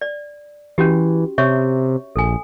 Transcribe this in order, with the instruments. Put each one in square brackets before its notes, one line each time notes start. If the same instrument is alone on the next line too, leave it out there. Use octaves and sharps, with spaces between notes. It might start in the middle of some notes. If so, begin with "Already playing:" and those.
[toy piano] D5
[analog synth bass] E3 [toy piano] C#4 F#4 G4
[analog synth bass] C3 [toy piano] C#5 E5 C#6
[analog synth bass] A#1 [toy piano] A4 G#5